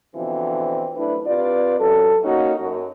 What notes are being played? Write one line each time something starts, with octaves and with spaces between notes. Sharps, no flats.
B2 D3 E3 F3 C4
F#2 A3 D4 E4 B4
C3 F4 B4 D5
F#2 A4
A#3 C#4 D#4 F#4
F#2